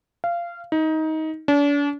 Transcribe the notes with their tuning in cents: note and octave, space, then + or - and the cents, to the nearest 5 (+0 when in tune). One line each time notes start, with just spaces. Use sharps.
F5 -20
D#4 +20
D4 -40